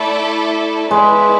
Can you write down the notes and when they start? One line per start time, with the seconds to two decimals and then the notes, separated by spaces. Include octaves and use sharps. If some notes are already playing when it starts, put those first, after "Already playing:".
Already playing: A3 E4 A4 D5 A5
0.91 G#3 B3 E4 B4 D5